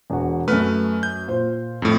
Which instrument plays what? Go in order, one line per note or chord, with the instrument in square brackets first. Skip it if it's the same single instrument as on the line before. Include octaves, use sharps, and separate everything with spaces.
[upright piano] E1 F#4
[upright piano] F#2 F6 [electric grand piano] A3 B4
[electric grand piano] G6
[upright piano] A#2 C5
[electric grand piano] F2 A2